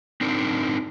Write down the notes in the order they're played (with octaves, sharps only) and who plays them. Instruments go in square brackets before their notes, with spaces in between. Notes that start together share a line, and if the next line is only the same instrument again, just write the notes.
[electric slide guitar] C4 D4 D#4 A#4